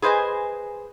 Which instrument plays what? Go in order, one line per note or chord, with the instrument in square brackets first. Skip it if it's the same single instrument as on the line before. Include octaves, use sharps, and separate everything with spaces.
[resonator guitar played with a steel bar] G#4 B4 C5 D#5 G#5